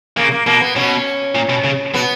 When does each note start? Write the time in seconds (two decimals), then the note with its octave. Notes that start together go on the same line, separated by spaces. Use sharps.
0.17 C#3 A#3
0.32 A#3
0.46 B2 A#3
0.61 B3
0.76 B2 C#4
1.35 A#2
1.50 B2
1.65 C#3
1.94 B2 B3